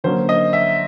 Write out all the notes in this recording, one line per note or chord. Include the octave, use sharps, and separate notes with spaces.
D3 F#3 A#3 C#4 C5
D#5
E5